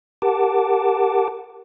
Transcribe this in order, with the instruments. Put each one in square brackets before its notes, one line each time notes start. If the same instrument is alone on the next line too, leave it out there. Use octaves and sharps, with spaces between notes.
[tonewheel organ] G4 A#4 F#5 A5 D6